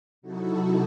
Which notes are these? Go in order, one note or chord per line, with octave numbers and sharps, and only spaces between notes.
C3 F#3 D#4 E4 F#4 A4